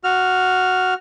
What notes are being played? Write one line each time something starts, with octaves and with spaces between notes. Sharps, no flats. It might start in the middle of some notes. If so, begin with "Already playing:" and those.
F#4 F6